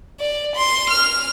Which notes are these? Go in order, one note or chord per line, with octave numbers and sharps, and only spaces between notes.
D5
C6
F6